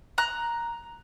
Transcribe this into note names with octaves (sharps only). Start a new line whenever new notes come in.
A#5 F#6